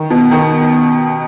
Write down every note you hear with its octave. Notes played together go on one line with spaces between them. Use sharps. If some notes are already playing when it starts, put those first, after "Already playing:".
Already playing: D#3
B2
D#3